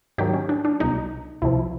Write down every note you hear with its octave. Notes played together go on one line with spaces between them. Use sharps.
G#2 D#3 F#3 G4
C#4
D4
D4
C2 B2 F#3 D#4
C2 C3 F3 E4